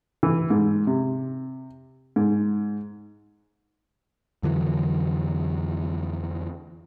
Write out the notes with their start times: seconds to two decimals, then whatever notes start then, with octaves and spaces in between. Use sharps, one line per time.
0.23 E3
0.50 G#2
0.87 C3
2.16 G#2
4.43 F2 D3 E3 F#3